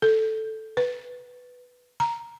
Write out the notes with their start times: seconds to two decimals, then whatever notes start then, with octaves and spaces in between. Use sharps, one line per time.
0.02 A4
0.77 B4
2.00 A#5